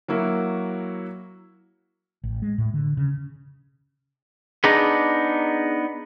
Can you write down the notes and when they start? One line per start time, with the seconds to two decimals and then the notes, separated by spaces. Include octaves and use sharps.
0.08 F#3 A#3 E4 F#4
2.24 A1
2.42 G#3
2.58 A2
2.74 D3
2.97 C#3
4.64 B3 D4 D#4 G#4